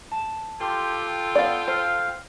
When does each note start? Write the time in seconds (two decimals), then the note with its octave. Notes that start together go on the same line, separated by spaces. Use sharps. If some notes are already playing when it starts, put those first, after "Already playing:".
0.11 A5 E7
0.61 F4 G4 A4 G5 C6
1.35 B3 D5 F5
1.68 C5 F5